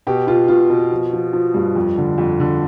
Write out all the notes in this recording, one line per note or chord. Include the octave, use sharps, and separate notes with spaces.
B2 G4
B2 F4
B2 F4
B2
F3
F3
F3
G2
F2
D3
F2
D3